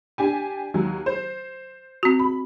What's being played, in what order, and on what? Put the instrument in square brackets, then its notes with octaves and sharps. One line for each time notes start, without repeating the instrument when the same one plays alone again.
[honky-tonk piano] D4 G4 G#5
D#2 F#3
C5
[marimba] C4 F#4
[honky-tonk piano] B5